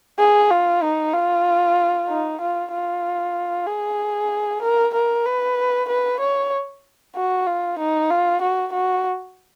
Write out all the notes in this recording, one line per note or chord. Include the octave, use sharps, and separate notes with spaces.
G#4
F4
D#4
F4
D#4
F4
F4
G#4
A#4
A#4
B4
B4
C#5
F#4
F4
D#4
F4
F#4
F#4